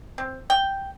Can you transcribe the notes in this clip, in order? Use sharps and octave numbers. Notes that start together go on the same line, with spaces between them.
C4
G5